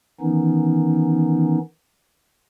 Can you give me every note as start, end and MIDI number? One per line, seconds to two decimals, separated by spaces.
0.21 1.58 51
0.21 1.58 52
0.21 1.58 59
0.21 1.58 61
0.21 1.58 63